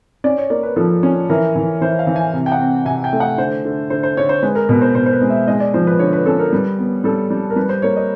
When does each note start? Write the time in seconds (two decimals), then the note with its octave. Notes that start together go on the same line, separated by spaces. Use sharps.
0.24 C#4 D5
0.38 C#5
0.50 A#3 D5
0.63 B4
0.76 F3 A4
1.03 C#4
1.30 E3 A#4
1.56 E3
1.81 E3 C5
1.99 F5
2.07 E3
2.16 G#5
2.33 C3
2.46 G5
2.52 F#5
2.60 C4
2.85 C3 G#5
3.04 G5
3.13 A3
3.20 F#5
3.38 D3 C5
3.65 D3
3.90 D3 C5
4.03 C5
4.17 D3 C#5
4.29 C5
4.43 G#3 B4
4.55 A#4
4.69 B2 B4
4.82 C5
4.95 B2 C5
5.06 C5
5.13 B4
5.22 G#3
5.30 E5
5.47 G#3 D#5
5.60 D5
5.74 F3 C5
5.87 B4
5.99 D3 C#5
6.13 B4
6.26 C#4 A4
6.39 A#4
6.52 G3 B4
6.79 B3
7.04 G3 A4
7.30 G3
7.50 A#4
7.56 G3 B4
7.69 C5
7.82 A#3 C#5
7.96 D#5